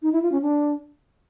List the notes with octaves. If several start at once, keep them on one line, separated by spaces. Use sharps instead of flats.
D#4
E4
F4
C#4
D4